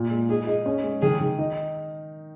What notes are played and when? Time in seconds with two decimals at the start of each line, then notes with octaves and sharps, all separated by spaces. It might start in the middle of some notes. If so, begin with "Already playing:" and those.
Already playing: A#2 F4
0.11 G#3
0.29 D#4 G#4
0.47 D#4
0.66 C#4
0.84 G#3
1.02 D#3 G#4
1.20 D#3
1.39 D#4